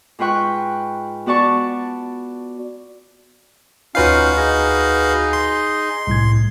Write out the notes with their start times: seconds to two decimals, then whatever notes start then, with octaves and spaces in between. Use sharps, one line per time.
0.19 G#2 F4 B4 G5 C#6 F#6
1.26 B3 F#4 D5 A5 C#6
3.95 D2 C#4 D#4 F4 F#4 B4 F5 C7
4.37 D#4 G#4 D#5
5.33 C6
6.07 C2 A2 G#6